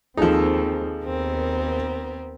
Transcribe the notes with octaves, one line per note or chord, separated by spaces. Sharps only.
D#2 F3 C4 D#4 G#4 A4
D#2 B3 C4 A#4